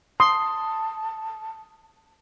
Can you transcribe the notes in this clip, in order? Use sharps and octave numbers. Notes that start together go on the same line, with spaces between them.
A5 C6 D#6